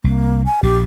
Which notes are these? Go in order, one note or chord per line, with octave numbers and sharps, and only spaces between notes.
C2 A#3
G#5
A#1 A#2 G4